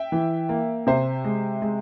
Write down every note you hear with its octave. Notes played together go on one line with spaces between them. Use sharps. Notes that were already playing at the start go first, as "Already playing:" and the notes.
Already playing: E5 G5
E3
A#3
C3 C5 E5
G#3
G#3